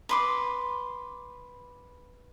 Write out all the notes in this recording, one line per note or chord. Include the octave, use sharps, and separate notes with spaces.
B4 C6 D6